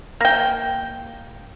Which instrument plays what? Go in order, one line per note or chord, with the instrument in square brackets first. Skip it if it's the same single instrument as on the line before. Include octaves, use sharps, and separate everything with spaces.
[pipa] A#3 G5